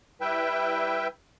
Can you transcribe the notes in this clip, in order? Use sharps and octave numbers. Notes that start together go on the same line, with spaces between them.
G3 E4 B4 E5 G5